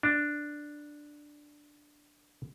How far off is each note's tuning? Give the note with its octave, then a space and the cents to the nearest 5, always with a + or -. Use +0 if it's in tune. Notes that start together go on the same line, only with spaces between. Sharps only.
D4 +5